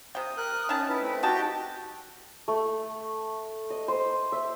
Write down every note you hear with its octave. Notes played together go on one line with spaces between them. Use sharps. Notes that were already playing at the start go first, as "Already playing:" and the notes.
C3 G5 D#6
A#4 F#6
D#3 C#4 E5 A5
E4 B4
A3 C4
D#4 F#4 G4 G5 A5
A3
D#5
C5
E5